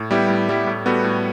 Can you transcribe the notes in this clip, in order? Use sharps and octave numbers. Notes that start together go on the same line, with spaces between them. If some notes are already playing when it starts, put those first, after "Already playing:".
Already playing: A2
G3 B3 E4 G4
A2
G3 B3 E4 G4
A2
G3 B3 F#4 A4
A2